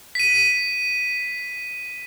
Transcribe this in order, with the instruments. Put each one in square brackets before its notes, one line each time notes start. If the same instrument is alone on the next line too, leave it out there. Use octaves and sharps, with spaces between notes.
[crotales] B6 D#7